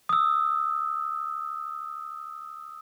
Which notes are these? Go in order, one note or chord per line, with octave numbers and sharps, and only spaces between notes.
D#6 E6